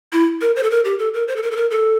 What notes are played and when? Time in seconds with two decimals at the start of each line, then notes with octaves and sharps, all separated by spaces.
0.13 E4
0.41 A#4
0.56 C5
0.63 A4
0.70 A#4
0.85 G4
0.99 A4
1.14 A#4
1.28 C5
1.36 A4
1.43 A#4
1.51 A4
1.56 A#4
1.71 A4